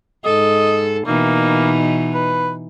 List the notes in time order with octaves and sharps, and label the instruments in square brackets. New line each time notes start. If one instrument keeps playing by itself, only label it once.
[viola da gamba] G#2 A4 [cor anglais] D#5
[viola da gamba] B2 E3 D#4 [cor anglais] A#3
[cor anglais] B4